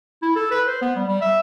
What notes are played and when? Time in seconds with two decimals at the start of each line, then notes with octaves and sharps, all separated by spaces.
0.22 E4
0.36 A4
0.51 B4
0.67 C5
0.82 B3
0.96 G3
1.07 G3
1.21 E5